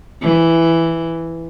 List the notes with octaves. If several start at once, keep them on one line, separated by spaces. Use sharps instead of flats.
E3